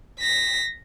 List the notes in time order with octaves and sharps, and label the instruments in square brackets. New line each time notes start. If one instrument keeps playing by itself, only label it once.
[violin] A#6 B6